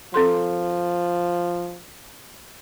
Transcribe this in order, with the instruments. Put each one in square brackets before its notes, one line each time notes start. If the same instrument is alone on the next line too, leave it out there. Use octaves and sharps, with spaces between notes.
[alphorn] F3 [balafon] C4 A4 C6